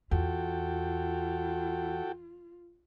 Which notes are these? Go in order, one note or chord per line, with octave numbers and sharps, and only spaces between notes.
E2 F4 F#4 A4 G5